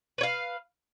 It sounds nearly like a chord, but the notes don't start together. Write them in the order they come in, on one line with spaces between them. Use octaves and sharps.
B4 C#5 F5